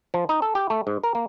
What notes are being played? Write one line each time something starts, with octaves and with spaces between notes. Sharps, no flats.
F3
D#4
A4
G4
A3
G#2
A#4
A#3